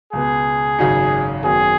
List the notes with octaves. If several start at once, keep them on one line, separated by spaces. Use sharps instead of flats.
C#2 B2 B3 G#4
G#1 F#2 C#3 F#3 D#4
G#1 F#2 D#3 F#3 B3 G#4